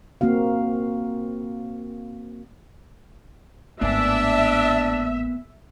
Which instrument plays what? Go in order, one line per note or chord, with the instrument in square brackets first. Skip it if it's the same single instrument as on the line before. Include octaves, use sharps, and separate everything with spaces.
[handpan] A#3 C4 F#4 F5
[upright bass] G#1 A2 [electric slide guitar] A#3 B3 G#5 [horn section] D4 [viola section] E5